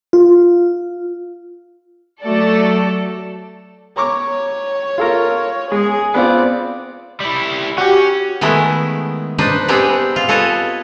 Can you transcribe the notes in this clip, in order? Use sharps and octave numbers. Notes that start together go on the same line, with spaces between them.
F4
F#3 A3 F#4 A4 D5
C#5 A#5 C#6 D6
F4 A4 A#4
G#3 G#4
B3 C4 F4 D5
G3 E4
C#4 F#4 G4
D#3 G#3 A3 B3 E4
D4 D#4 B4 C5
G3 B3 C4 D4 G4 G#4
F4
A4 B4 C#5 D#5